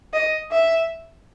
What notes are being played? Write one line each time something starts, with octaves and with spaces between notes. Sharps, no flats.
D#5
E5